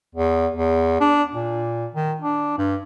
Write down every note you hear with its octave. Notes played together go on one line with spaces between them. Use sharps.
E2
E2
D4
A#2
D#3
D4
G2